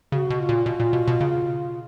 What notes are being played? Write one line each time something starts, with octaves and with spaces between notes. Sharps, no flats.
C#3 F#4
B2
F4
A#2
B2 F4
A#2
B2
B2
C#3